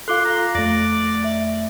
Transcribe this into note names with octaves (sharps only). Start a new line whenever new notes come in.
F4 A4 F5 C6 D6 F#6
A#5
F2 A3 D5 A#6
E5